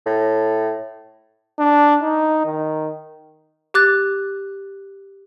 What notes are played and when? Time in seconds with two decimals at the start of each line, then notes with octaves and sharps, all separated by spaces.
0.06 A2
1.59 D4
2.02 D#4
2.45 D#3
3.74 G4 D6 F#6 A6